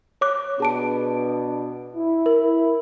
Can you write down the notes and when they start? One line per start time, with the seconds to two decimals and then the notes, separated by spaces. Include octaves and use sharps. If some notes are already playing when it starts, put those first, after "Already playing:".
0.21 C#5 D6 F#6
0.60 B2 B3 D4 G#4 A5 D7
1.95 E4
2.26 A#4